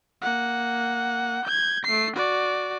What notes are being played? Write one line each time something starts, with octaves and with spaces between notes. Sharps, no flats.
A#3 F#5
G6 G#6
A3 C7
F#4 D5